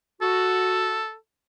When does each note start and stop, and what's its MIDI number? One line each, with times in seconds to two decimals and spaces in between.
0.21 1.01 66
0.21 1.15 69